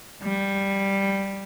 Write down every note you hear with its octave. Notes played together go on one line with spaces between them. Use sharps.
G3